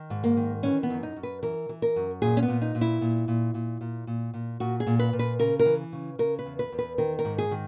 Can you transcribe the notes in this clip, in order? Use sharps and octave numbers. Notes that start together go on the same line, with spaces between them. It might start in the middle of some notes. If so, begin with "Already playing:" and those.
Already playing: D#3
G#2
A#3
D#3
E3 C#4
B3
F#2
D#4
F#2
B4
E3 A#4
E3
A#4
F#2
A#2 G#4
C#4
B3
A#2
D#4
A#2
E4
A#2
A#2
A#2
A#2
A#2
A#2
A#2 F#4
G#4
A#2
B4
A#2
B4
C#3 A#4
A#4
E3
C#3
C#3 A#4
B4
E2
B4
E2
B4
D#3 A#4
A#4
G#2
G#4
D#3